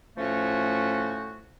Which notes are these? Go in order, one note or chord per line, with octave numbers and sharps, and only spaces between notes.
A2 F3 A3 C#4 F#4